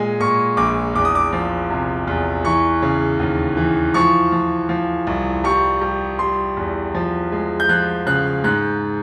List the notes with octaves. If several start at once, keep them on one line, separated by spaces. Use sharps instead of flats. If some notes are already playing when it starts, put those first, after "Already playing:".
Already playing: A#2 G#3 G#5
A#2 C#6
A#1 D6
E2 D6
D#6
D6
F3
C3
E2
E3 C#6
C#3
D#2
E3
F3 C#6
F3
F3
C2
G3 C#6
G3
G3 C6
E2
F3
G#3
G6
F3 F#6
C#3 F#6
G#2 F#6